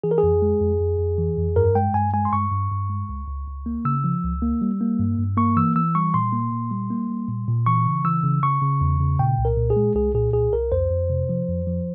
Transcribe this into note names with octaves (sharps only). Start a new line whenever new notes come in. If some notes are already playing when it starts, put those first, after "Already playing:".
E3 G#4
A#4
G#4
F2
G#3
F2
F2
F2
E3
F2
G2 A#4
G#3 G5
G2 G#5
G#3 G#5
C6
G2 C#6
G2
G2
G#3
C#2
C#2
C#2
A#3
C#3 E6
F3
C#2
A#3
G3
A#3
G2
G2
A#3 C#6
E3 E6
E3 E6
G3 C#6
A#2 C6
A#3
A#2
G3
A#3
G3
A#2
A#2
E3 C#6
C#3
E3 E6
C#3
C#3 C#6
C#3
E2
C#3
A#2 G5
C2
A#4
A#2
G#4
G#3
C2 G#4
A#2 G#4
C2 G#4
C2 A#4
F2 C5
F2
C3
F3
F2
F3